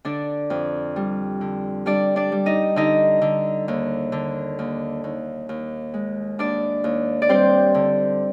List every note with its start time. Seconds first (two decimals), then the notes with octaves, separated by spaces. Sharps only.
0.05 D3 D4 D5
0.50 F2
0.96 G3
1.41 D3
1.86 G3 D4 D5
2.16 D4 D5
2.32 G3
2.46 D#4 D#5
2.76 D3 D#4 D#5
3.22 D3
3.68 D#2
4.12 D3
4.59 D#2
5.04 D#2
5.49 D#2
5.94 G#3
6.39 D#2 D4 D5
6.84 D#2
7.22 D5
7.29 G3 C4 C5
7.75 D3